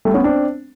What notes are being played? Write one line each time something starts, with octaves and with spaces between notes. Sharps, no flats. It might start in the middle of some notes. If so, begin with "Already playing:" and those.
G3 A3
B3 C#4
C4 D4